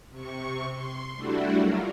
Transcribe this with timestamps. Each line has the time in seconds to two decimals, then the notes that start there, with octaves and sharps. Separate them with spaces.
0.10 C3 C#6
0.72 C6
1.15 G3 A3 D4 E4 F#4
1.56 F#3 F4 A#4